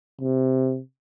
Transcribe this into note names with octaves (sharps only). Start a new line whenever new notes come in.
C3